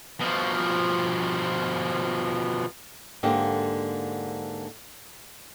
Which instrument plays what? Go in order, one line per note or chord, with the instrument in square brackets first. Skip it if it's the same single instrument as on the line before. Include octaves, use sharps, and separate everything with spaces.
[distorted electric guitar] B2 F3
[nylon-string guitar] G#2 D3 A#3 G4 F5